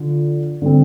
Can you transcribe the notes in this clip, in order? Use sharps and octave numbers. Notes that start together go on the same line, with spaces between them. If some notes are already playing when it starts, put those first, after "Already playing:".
Already playing: D3 F3
D3 G3 C4